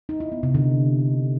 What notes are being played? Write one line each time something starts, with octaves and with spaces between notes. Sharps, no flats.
D#4
E4
B3
C3
D3